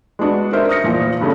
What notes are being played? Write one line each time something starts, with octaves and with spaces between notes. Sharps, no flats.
G#3 B3 D4 F#4
D#4 F#4 A#4 C5 E5
D#6 F6 A#6 C#7
E2 A#2 F3
G2 C#3 A3 C#4